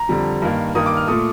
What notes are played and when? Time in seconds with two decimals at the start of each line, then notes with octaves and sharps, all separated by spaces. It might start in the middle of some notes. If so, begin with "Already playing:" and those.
Already playing: A#5
0.09 F2 D3 G3
0.42 G2 D#3 A#3
0.75 G2 D#3 A#3 D#6
0.86 D6
0.97 F6
1.07 A#2 A3 D#6